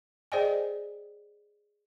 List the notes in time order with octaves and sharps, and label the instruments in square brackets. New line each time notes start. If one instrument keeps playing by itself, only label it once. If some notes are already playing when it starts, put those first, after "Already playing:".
[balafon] G#4 C5 D5 D#5 G5 G#5